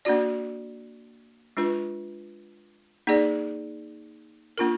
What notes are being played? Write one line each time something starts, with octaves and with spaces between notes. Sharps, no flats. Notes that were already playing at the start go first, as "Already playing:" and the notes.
A#3 D4 F#4 D5
G#3 D4 F4 B4
A#3 D#4 G#4 D5
A#3 D4 F4 A#4